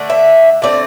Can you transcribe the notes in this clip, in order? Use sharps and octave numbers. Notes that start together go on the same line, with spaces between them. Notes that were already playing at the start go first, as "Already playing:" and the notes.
Already playing: D3 A3 D4
E5
D3 A3 C4 D5